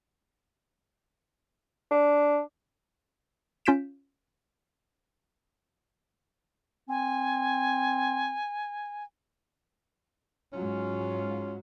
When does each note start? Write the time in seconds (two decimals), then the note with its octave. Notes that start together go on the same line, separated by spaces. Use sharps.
1.91 D4
3.66 C#4 F4 G6 B6 D7 E7
6.89 C4 G#5
10.53 G#2 F#3 C#4 F4